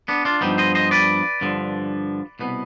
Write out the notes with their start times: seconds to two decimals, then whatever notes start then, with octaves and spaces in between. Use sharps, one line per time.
0.08 B3 D4
0.25 D4 F4
0.41 G2 F3 B3 D#4 G4
0.58 C5 D#5
0.75 C5 D#5
0.91 B4 D5
1.41 G2 D3 F3
2.39 C2 B2 B3